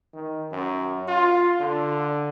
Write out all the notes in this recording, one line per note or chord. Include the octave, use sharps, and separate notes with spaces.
D#3
F#2
F4
D3